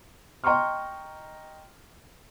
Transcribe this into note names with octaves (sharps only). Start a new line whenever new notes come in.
D#5 G5 A#5 C6 C#6 F6